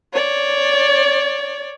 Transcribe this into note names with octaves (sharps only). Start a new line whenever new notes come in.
C#5 D5